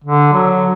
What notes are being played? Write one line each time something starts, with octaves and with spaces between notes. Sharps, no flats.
D3
F#3